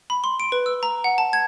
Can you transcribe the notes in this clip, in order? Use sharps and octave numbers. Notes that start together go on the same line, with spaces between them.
B5
C6
D7
B4
E6
A#5
F#5
A5
G#6